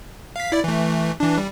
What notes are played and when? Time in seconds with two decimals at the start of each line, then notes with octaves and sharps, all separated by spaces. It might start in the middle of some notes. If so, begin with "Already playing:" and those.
0.36 F5 B6
0.52 E4 D5
0.64 E3 A3
1.20 E3 D4
1.38 G3